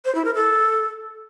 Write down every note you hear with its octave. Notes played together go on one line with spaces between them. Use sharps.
C5
E4
A#4
A4